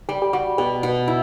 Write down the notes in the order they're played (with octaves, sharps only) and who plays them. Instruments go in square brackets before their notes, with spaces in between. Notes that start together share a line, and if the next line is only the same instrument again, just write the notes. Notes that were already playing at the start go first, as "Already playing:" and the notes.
[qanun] G3 [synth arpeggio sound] G4
[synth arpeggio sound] G4
[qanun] G3 [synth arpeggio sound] F#4
[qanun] B2 [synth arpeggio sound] G4
[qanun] B2
E4